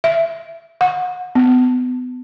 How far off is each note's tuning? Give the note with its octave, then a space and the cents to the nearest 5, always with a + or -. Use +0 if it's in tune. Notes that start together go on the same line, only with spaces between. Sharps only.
E5 +15
F#5 -35
B3 +30